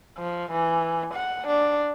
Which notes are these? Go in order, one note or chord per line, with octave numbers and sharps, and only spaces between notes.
F3
E3
F#5
D4